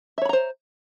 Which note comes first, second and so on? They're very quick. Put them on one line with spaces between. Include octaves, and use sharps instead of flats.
E5 C#5 B5 A#5 C5